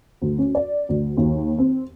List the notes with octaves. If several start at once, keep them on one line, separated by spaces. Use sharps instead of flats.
D2
C#4
D5
D2
D#2
C4